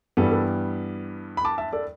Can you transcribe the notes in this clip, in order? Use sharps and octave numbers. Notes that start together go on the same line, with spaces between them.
G2 E3 G3 B3 A4
A4
B5
A5 D6
E5 A5
A4 D5